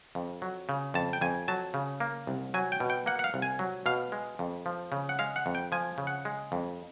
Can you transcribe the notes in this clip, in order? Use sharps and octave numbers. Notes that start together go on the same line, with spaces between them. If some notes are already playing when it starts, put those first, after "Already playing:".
F2
F#3
C#3
F2 A5
G5
F2 G#5
F#3 A5
C#3
A#3
C2
F#3 G#5
G5
B2
G5
A#3 F#5
F#5
F5
C2
G#5
F#3
B2 F5
G#3
F2
F3
C#3
F#5
G#3 F5
F#5
F2
G5
F3 G#5
C#3
F#5
G#3
F2